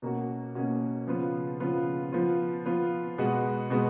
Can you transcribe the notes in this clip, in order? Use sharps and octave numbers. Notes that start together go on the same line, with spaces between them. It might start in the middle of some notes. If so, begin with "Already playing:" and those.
B2 A#3 C#4 F#4
B2 A#3 C#4 F#4
C#3 F3 B3 F4
C#3 F3 B3 F4
F3 B3 F4
F3 B3 F4
B2 G#3 B3 F#4
B2 G#3 B3 F#4